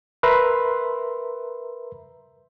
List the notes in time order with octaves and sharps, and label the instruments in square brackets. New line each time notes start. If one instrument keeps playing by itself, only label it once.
[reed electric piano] A#4 B4 E5 A#5 C6